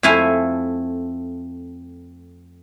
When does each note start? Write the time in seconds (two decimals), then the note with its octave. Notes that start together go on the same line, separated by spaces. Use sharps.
0.03 F2 A3 E4 F5 G#5